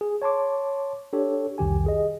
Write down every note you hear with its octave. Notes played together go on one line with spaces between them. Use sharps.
G#4
C#5 A5 C6 D6
D4 G4 A4 C#5
C2 F2 D#3 G4 G#5
G#4 D#5